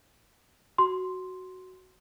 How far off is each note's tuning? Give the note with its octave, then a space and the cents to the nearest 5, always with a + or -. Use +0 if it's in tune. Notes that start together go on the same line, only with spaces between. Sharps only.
F#4 +5 C6 +0